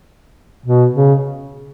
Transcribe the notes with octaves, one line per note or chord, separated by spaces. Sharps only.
B2
C#3